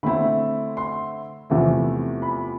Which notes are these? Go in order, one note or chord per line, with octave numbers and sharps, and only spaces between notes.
D3 A3 C4 E4 B5
C6
E2 C3 F3 A3 E4
B5